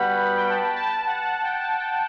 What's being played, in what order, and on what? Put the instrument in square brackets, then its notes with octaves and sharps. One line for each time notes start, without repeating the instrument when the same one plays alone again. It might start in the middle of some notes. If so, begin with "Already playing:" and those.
Already playing: [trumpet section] G3 B3 F#4 B4 F#5 [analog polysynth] B5
[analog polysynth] G5
A5
A5
A5
A5
F#5
F#5
G5
A5
G5